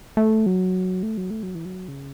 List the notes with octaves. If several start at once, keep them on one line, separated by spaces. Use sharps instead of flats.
A3
F#3
A3
F#3
A3
F#3
E3
F#3
C#3